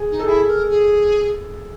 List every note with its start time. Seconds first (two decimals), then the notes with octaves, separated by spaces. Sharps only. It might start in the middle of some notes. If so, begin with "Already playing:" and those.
Already playing: G#4
0.11 D#4
0.20 A4
0.27 E4 G#4
0.48 A#4
0.70 G#4